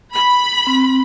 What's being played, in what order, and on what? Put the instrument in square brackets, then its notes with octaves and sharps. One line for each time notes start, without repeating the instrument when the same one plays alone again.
[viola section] B5
[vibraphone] C4